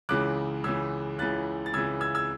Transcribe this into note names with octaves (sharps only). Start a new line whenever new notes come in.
C#2 C#3 E3 D6 F#6
C#2 C#3 E3 E6 G#6
C#2 C#3 E3 F#6 A6
A6
C#2 C#3 E3 E6 G#6
E6 G#6
E6 G#6